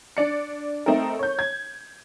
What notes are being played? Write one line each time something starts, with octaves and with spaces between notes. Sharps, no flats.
D4 D5 C#7
A3 C4 D#4 A4 A#4
C#5 G6
G#6